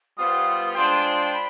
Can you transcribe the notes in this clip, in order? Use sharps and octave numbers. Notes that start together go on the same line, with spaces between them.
G3 B3 F4 C5 F5 D#6
G#3 D4 F4 C5 G5 C6
B5